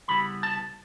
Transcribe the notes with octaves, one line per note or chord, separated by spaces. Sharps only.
C#3 G3 B3 E4 B5
A5